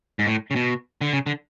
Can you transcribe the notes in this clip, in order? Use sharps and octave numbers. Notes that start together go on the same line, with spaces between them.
G#2
A2
C#3
B2
D3
C#3
D3